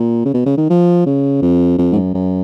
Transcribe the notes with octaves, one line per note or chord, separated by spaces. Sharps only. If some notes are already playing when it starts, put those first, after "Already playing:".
Already playing: A#2
C#3
B2
C#3
D#3
F3
C#3
F2
F2
G#2
F#2
F#2